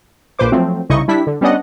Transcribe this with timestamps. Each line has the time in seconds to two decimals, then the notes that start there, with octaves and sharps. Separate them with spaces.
0.39 A#1 A#2 B4 C5 D6
0.52 F3 F#3 A3 C4
0.89 C2 C#3 D#4 E4 D#5 C#6
1.08 G3 D4 E4 B6
1.27 D3
1.41 G3 B3 C#4 D4 D#5 F#5